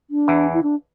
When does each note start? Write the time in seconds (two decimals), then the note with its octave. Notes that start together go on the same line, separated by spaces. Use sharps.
0.10 D4
0.28 E2 E3
0.54 E4
0.63 D4